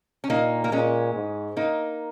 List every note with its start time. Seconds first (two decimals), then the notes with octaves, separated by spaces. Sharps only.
0.24 C#4
0.30 A#2 A#3 D#4
0.64 A#3
0.72 A#2 G#3 C#4
1.15 G#2
1.57 A#3 D#4